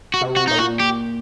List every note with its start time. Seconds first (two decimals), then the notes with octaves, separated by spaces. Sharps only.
0.14 F#4
0.21 C3
0.36 F#4
0.47 A#2 D#4
0.58 F#4
0.80 G4